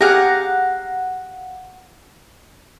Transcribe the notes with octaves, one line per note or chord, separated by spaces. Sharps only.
G4 G#4 F5 F#5 A#5